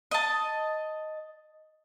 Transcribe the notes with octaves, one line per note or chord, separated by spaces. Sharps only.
D#5 A5